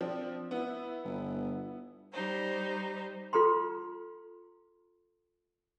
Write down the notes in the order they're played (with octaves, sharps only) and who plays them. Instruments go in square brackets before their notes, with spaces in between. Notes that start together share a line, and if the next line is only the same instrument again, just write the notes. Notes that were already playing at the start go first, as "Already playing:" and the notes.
[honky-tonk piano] F3 C4 D4
B3 E4
[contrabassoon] G1
[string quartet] G3 D#4 C5
[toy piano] F4 A4 B4 A#5 C6